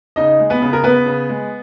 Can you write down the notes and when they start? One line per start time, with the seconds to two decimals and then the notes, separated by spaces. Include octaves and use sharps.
0.16 C#3 D#4 D#5
0.39 G#3
0.50 B3 B4
0.62 C#3
0.73 A#4
0.84 C#3 B3 B4
1.06 C#3
1.29 G#3